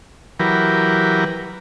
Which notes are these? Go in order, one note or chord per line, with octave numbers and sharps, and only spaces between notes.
E3 F#3 G4 A#4 B4